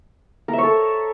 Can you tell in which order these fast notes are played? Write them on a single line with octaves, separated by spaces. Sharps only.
A#4 E5 C#5 A4